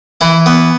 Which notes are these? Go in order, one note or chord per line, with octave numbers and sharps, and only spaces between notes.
E3 E4
B3